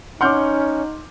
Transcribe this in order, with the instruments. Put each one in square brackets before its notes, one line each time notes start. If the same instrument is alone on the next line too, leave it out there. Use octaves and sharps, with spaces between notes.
[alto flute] C#4 [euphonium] D#4 [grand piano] F#5 F6 G6 [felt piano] C6 D6